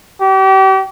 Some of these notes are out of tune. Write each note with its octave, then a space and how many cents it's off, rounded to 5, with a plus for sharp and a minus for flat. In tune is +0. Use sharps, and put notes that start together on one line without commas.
G4 -35